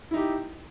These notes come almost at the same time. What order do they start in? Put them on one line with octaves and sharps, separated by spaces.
E4 D#4 G4